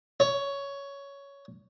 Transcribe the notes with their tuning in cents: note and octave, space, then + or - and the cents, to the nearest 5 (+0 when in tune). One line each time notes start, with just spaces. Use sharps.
C#5 +10